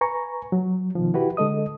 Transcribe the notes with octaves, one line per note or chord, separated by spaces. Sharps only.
B4 G#5 A#5 C#6
F#3
B2 D#3 F3
E4 F#4 G4 B4
D3 G#3 A4 D#5 D#6